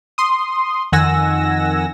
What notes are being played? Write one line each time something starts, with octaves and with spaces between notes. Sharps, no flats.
C6 D#6
F2 D#3 F#5 G#5 E6 A#6